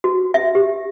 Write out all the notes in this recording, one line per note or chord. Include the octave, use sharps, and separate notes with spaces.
F#4
E5
G4